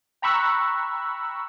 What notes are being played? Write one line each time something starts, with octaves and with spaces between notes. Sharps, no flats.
G5 A#5 B5 C#6 E6 F#6